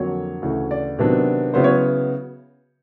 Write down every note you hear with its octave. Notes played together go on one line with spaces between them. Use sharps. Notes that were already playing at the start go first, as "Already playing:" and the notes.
Already playing: F2 D3 F#3 A#3 C#5
D2 C#3 E3
D5
C3 D#3 F#3 B3 D4
C#3 F#3 B3 E4 C5
C#5